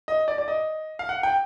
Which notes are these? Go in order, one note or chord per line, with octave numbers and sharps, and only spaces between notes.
D#5
D5
D5
D#5
F5
F#5
G5